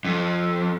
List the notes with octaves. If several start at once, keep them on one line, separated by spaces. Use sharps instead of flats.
F2